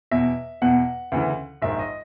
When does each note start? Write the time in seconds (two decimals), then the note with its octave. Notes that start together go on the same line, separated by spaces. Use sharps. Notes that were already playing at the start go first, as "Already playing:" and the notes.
0.11 E2 B2 E5
0.62 E2 B2 F#5
1.12 D2 C#3 E3
1.62 A#1 G#2 D#3 E5
1.79 D#5